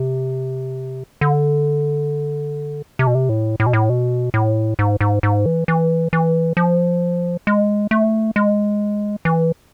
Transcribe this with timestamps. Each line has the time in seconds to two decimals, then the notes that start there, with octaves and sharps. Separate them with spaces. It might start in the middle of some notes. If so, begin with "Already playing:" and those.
Already playing: C3
1.21 D3
2.99 C3
3.07 B2
3.15 C3
3.29 A2
3.60 A2
3.66 B2
3.73 A2
3.89 B2
4.34 A2
4.79 G#2
5.01 G#2
5.23 G#2
5.46 E3
5.68 E3
6.13 E3
6.57 F3
7.47 G#3
7.91 A3
8.36 G#3
9.25 E3